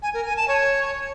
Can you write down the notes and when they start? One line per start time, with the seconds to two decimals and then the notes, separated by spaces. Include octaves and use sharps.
0.03 G#5
0.14 A#4
0.25 G#5
0.37 A5
0.48 C#5